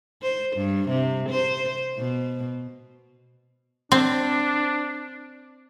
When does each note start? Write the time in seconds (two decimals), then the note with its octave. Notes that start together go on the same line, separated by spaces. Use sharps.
0.22 C5
0.57 G2
0.89 C3
1.29 C5
1.98 B2
3.92 C4 D4